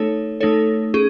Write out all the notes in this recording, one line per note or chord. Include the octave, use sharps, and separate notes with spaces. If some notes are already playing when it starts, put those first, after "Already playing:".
Already playing: A3 D#4 A4 C#5
A3 D#4 A4 C#5
C#4 G#4